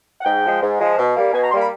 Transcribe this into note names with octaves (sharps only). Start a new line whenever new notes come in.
F#5
G#2 G5
F3 G#3
G#2
F3 G#3
B2
G3 A#3
B2 G#5
A#5
G3 A#3 C6
B5